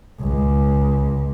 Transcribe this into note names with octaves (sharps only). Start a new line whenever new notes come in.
C#2